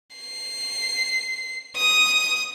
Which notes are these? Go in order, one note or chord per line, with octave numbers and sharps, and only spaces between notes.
C7
D#6